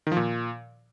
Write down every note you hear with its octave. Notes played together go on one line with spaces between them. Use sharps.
D#3
F3
A#2